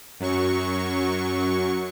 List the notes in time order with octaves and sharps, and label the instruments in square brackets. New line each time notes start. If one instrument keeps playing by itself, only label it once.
[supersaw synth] F#2 F#3 C#6